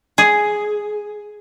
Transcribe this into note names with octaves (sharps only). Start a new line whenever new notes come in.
G#4